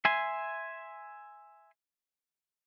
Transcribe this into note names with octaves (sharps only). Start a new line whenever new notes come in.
E5 G#5 C6